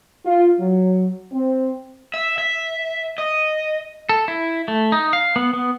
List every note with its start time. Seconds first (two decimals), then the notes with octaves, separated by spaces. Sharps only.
0.25 F4
0.59 F#3
1.32 C4
2.14 E5
2.38 E5
3.18 D#5
4.09 A4
4.28 E4
4.68 A3
4.92 D#4
5.13 F5
5.36 B3
5.53 B3